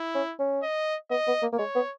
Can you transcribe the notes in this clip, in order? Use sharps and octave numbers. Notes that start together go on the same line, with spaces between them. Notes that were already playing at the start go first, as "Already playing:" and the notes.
Already playing: E4
C#4
C#4
D#5
B3 D#5
B3
A#3
A#3
G#3 C#5
B3